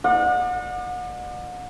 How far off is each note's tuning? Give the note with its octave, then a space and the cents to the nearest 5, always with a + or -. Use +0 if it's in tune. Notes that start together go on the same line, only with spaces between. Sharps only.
D5 +40 F#5 -35